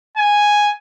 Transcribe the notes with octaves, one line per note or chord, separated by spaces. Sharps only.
G#5